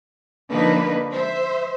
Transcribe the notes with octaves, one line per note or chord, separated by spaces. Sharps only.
D3 F3 A#3 D4 D#4 B4
C5 E5